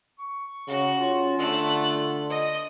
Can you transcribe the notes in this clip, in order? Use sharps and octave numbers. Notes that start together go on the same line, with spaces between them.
C#6
C#3 F#4
C#4 F4
D3 A3 F#6
D#5